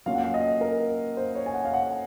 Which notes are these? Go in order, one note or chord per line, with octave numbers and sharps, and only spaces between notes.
F#3 A#3 C#4 F4 F5
F#5
F5
D#5
A#4
C5
C#5
G#5
F#5
F5
F#5